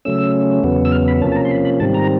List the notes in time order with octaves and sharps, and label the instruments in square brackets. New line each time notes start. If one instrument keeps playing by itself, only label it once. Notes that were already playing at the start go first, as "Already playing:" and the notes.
[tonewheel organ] C#3 F#3 A3 C#4 E6
E2 C#3 F#3 B3
E6
F6
B5
C3 F3 A#3 C#4 A5
A5
A#5
C6
B5
B5
G#2 D#3 G3 C4 A5
A#5